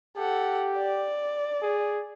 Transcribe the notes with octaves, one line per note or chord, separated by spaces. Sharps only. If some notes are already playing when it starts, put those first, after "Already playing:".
G4 A4 F#5
D5
G#4